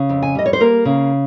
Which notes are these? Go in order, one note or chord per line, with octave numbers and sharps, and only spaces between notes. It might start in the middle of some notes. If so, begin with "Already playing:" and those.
Already playing: C#3
F2
G#5
G3 D#5
C#5
C5
A#3 A#4
C#3